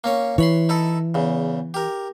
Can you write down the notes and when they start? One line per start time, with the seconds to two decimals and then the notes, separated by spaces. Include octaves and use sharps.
0.04 A#3 C#4 C#5
0.38 E3 C#5 B5 C6
0.69 D#4 E4 A4
1.14 E2 C#3
1.74 G4 A#4